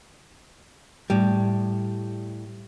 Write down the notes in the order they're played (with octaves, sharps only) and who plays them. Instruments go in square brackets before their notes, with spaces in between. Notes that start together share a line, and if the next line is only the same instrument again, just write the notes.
[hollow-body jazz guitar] A2 G3